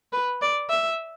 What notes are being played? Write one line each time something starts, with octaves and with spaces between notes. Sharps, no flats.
B4
D5
E5